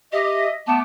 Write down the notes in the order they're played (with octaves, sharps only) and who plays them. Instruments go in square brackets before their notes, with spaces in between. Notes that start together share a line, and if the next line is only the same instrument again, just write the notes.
[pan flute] G4 [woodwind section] D#5 E5
[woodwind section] A3 B3 D6 [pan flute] A5